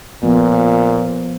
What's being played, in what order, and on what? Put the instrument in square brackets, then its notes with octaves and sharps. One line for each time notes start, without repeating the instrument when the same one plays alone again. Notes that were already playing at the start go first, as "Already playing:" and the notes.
[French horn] A#2 [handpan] F3 A#3 B3